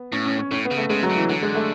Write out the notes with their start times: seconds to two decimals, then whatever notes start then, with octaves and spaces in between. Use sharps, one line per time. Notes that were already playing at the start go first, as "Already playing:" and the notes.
Already playing: B3
0.12 A2 C#4
0.25 C#4
0.38 C#4
0.51 A2 C#4
0.65 B3
0.71 C#3
0.77 A3
0.90 C#3 G#3
1.03 F#3
1.10 C#3
1.17 E3
1.29 D3 F#3
1.42 G#3
1.55 A3